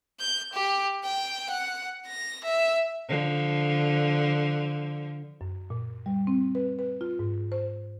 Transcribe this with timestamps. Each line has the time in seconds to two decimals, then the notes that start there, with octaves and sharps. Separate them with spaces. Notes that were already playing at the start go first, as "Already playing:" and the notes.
0.20 G6
0.53 G4
1.04 G5
1.50 F#5
2.07 A#6
2.44 E5
3.09 D3 F3
5.41 F#2
5.70 A#2
6.06 G3
6.27 C4
6.55 B4
6.79 B4
7.01 F4
7.19 G#2
7.52 C5